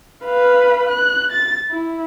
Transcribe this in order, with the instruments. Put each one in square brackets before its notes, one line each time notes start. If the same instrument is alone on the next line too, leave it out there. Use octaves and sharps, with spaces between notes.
[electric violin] B4 F5
F#6
A6
E4